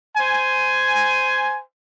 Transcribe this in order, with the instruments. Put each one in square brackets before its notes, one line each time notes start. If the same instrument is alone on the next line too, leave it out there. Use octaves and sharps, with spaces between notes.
[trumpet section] C5 G#5